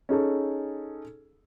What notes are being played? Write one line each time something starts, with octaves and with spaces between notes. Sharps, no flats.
C#4 D#4 G#4 A4